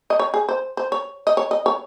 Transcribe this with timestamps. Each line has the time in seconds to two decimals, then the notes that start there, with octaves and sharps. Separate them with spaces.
0.10 D#5
0.20 C#5
0.34 G#4
0.49 C5
0.77 C5
0.92 C#5
1.27 D#5
1.37 C#5
1.51 D#5
1.66 C#5